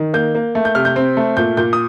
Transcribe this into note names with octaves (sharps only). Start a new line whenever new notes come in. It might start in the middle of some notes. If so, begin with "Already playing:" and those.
Already playing: D#3
A#3 G6
A#3
A3
G6
C3 F6
G6
C4
A3
A#2 G6
A#2 G6
D#6